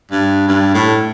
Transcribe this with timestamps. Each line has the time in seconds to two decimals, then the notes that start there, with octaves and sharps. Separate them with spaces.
0.12 G2
0.49 G2
0.74 A2